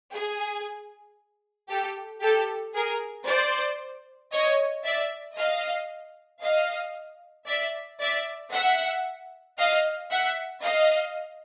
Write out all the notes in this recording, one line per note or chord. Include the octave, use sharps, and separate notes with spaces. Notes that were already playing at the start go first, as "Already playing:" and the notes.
G#4
G4 A4
G4 A4
G#4 A#4
C5 D5
C#5 D#5
D5 E5
D#5 F5
D#5 F5
D5 E5
D5 E5
E5 F#5
D#5 F5
E5 F#5
D#5 F5